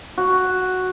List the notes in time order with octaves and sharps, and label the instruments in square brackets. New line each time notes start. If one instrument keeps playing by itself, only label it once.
[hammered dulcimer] F#4